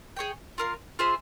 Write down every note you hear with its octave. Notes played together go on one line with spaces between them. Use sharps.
G#4 C#5 G5
F4 A#4 F5
F4 G#4 C5 E5